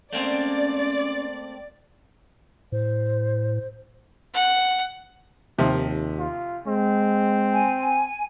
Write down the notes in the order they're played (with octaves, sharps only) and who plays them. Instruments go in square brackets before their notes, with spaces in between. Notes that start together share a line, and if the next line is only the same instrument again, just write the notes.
[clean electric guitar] A3 A#3 C4 [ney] C#4 [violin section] D5
[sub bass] A2 [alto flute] C5
[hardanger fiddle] F#5
[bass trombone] D#2 [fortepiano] C3 D#3 F3
[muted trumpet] F4
[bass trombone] G#3 [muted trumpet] C4
[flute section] G#5